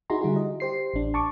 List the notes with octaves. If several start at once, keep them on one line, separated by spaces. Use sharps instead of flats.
D#4 E4 F#4 G#4 A#5 C6
D3 G3 E4 F#4 G#4
D#5
G4 C5 C7
A1 D4
A5 C#6 D6